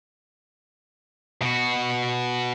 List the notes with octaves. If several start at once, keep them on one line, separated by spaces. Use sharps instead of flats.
B2 F#4